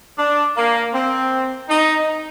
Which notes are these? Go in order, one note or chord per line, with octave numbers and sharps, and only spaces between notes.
D4
A#3
C4
D#4